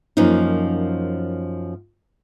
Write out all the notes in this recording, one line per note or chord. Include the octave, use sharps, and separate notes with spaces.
F#2 F3 A#3 C#4 D#4